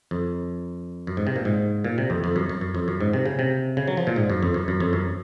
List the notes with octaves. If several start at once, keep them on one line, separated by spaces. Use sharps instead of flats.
F2
F#2
G#2
C3
A#2
G#2
A#2
C3
F2
F2
F#2
F#2
F#2
F2
F#2
G#2
C3
C#3
C3
C#3
F#3
F3
A#2
G#2
F#2
F2
F#2
F#2
F2
F#2